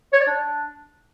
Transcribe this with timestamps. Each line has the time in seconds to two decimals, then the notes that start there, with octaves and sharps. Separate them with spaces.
0.13 C#5
0.20 D5
0.27 D4